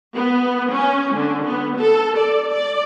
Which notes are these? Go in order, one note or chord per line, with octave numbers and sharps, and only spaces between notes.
B3
C#4
D3
B3
A4
D5
D5